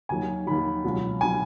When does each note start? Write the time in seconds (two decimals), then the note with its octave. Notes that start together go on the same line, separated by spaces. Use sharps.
0.09 D#2 D#3 F#3 G#5
0.47 D#2 D#3 F#3 B5
0.85 C#2 B2 F#3
1.21 B2 F#3 G#5